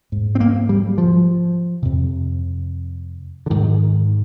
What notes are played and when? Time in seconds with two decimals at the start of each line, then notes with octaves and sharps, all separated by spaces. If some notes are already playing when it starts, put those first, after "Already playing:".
0.12 G#2
0.35 C4
0.40 A#3
0.69 G3
0.98 F3
1.82 F2 C3
3.46 D3
3.50 G#2 D#3